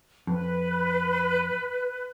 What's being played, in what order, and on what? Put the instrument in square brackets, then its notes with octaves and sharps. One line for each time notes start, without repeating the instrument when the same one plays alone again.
[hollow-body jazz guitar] F2 [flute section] B4